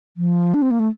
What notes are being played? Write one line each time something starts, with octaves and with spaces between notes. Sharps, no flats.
F3
D4
C4
A#3
A3